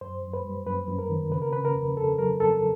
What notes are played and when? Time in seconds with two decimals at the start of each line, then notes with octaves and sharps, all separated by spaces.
0.01 F#2 C5
0.23 F#2
0.34 B4
0.45 G3
0.66 F#2 B4
0.88 F#2
0.99 A#4
1.10 D#3
1.31 C#3 B4
1.42 A#4
1.53 C#3 B4
1.65 A#4
1.75 F2
1.97 F2 A4
2.18 F#3 A#4
2.40 F2 A4